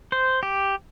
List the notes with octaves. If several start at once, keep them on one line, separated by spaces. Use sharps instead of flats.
C5
G4